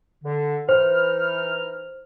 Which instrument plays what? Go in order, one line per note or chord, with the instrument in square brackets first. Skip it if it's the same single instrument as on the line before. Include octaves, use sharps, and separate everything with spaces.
[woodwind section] D3
[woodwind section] E3 D#4 F6 [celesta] C5